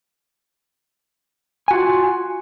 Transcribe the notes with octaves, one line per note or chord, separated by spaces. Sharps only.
F4 F#4 G#5